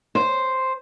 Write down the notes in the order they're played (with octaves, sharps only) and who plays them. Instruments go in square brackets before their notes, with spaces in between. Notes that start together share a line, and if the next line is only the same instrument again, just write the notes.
[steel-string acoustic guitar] C5